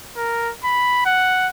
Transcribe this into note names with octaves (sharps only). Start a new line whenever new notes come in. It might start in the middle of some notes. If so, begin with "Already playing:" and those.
A#4
B5
F#5